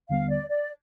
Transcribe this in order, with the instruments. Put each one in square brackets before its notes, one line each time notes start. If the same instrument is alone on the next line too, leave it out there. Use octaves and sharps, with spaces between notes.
[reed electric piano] D#2 D3 G3 B3 [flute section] F5
[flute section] D5
D5